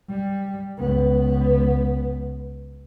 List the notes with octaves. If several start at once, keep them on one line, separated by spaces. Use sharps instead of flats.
G3
C#2 B3